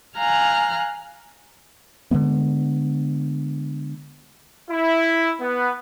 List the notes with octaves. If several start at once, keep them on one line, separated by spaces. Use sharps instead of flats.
F5 G#5 A#5 F6 F#6
D3 D#3 G#3 B3
E4
B3